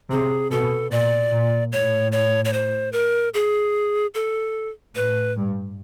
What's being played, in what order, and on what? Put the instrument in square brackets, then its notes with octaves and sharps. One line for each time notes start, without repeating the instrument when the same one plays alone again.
[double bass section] C3 [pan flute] G#4
[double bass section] B2 [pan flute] A4
[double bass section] A#2 [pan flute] D5
[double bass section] A#2
[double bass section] A2 [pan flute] C#5
[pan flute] C#5
C#5
C5
A#4
G#4
A4
[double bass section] A2 [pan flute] B4
[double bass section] G2